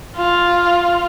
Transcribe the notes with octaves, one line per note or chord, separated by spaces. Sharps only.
F4